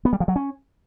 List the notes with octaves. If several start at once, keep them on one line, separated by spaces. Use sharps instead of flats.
B3
G3
F3
F#3
C#4